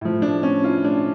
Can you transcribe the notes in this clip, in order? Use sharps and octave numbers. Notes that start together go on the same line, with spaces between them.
A2 F3
D4
C#4
F4
D4